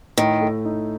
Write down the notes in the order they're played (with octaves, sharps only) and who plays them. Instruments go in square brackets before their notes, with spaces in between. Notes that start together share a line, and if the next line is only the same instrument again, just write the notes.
[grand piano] A2 [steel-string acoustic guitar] D#3
[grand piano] A3
D#4